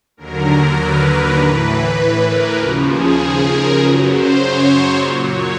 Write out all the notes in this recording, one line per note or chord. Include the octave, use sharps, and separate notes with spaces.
D#2 D3 F#3 A#4
B4
A2 E3 B4
A#4
D#2 C#3 F3 F#4
G#4
A#4
F#2 C#3 F#3 B4
C5
C#5
C#5
A#2 F#3 D5
C#5